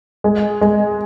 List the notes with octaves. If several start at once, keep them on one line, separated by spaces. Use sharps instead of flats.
G#3
G#3